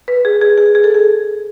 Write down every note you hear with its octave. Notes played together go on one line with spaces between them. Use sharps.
B4
G#4
G#4
G#4
G#4
A4
G#4